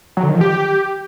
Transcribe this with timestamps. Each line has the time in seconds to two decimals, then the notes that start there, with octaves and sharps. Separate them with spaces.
0.17 F#3
0.23 D3
0.29 D#3
0.35 F3
0.41 G4